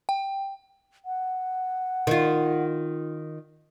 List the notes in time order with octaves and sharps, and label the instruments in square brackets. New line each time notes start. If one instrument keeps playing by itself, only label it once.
[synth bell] G5
[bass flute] F#5
[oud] D#3 F4